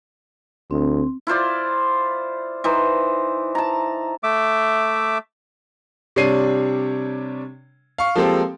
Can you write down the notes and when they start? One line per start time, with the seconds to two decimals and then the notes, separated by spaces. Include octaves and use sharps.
0.71 D2 C4
1.27 E4 F4 C5 D5
2.64 E3 D#4 C5
3.55 A5 A#5
4.23 A3 E5 D6
6.16 C3 G3 D4 C#5 C7 D#7
7.98 F5 C#6
8.15 F3 G#3 A#3 C4 G4 A4